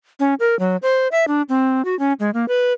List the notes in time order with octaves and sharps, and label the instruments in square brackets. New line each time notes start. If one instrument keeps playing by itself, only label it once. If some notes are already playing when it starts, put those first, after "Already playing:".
[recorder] C#4
A#4
F#3
C5
E5
D4
C4
F#4
C#4
G#3
A#3
B4